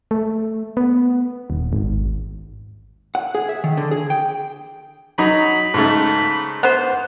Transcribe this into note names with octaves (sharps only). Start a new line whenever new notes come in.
A3
B3
D#1
G#1
F#5
G#4
E5
D#3
D3
G#4
G5
F#3 D#4 B5
G#2 C#3 A3
B3 C5